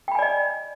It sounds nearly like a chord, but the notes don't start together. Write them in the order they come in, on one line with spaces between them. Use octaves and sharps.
G5 B5 G#5 D5 D#5